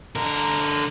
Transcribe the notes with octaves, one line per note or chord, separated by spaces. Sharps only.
D3 A#4